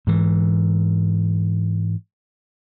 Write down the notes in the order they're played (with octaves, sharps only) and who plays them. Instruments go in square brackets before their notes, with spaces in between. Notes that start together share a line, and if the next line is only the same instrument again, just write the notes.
[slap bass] G#2 E3